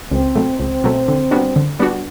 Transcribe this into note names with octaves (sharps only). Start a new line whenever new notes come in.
C#2 C4
B2 F#3 A3
C#2 C4
B2 F#3 A3
D3
G3 B3 D4 F#4
D3
G3 B3 D4 F#4